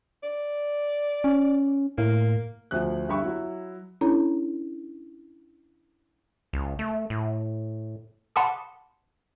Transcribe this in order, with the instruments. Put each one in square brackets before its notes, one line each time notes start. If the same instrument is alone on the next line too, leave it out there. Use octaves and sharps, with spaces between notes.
[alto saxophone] D5
[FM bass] C#4
[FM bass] A2 [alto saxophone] A#3
[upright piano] D2 F3 F#6
G2 D3 G4 E5 B5 C#6
F#3 E4
[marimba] C#4 D4 E4 A4 C#5 A#5
[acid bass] C#2
A3
A2
[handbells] F#5 A5 B5 C6 D6 D#6